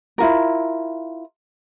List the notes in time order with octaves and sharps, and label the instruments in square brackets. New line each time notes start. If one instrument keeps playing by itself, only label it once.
[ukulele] E4 F4 A#4